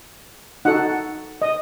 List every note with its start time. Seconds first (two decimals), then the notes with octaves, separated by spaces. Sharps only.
0.65 D#4 F#4 A4 F#5
1.42 D#5